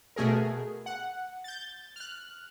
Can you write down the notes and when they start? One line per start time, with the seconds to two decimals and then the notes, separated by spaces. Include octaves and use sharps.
0.16 B2 A3 G#4 A#4
0.86 F#5
1.44 G6 A6
1.96 F6 F#6